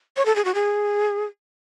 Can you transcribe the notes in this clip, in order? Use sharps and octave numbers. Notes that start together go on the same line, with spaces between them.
C#5
A4
G#4
F#4
G#4